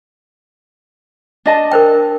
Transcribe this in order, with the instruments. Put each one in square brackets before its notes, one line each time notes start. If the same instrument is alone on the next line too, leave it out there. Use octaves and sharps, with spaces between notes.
[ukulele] D4 D#5 A5
[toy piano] A#4 C5 G5